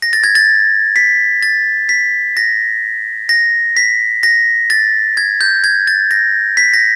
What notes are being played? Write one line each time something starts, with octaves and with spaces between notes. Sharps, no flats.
A#6
A6
G#6
A6
B6
A6
B6
A#6
A#6
B6
A#6
A6
G#6
G6
G#6
A6
A#6
B6
A#6